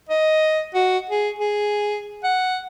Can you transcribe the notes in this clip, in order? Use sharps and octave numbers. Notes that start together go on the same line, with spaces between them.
D#5
F#4
G#4
G#4
F#5